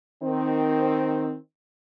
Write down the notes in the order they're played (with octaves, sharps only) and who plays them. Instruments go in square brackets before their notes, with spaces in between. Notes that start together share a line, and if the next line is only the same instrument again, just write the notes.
[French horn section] D#3 C4